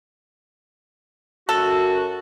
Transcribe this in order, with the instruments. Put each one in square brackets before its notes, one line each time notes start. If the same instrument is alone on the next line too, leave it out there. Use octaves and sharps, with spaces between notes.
[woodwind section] F#2 F#4 [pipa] A4